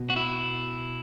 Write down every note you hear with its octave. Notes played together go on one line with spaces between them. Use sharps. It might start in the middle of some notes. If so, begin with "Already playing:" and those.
Already playing: B2
F#4
E4